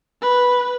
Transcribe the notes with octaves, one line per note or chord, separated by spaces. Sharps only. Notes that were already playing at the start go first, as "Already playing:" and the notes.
B4